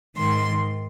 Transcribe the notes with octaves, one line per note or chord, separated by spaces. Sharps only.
G#2 D#3 C6